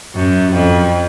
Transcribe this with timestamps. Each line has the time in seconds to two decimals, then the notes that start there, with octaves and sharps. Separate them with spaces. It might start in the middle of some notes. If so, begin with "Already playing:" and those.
0.15 F#2
0.53 F2